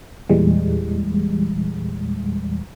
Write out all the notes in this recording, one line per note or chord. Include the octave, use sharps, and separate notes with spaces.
E2 A#2 E3 G3 G#3